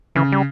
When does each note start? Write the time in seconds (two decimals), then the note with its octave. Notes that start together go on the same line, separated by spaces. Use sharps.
0.15 C#3 E3
0.32 G3